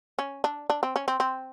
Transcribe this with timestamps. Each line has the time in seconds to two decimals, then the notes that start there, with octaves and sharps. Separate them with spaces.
0.19 C#4
0.44 D4
0.70 D4
0.83 C4
0.96 C#4
1.08 C4
1.20 C4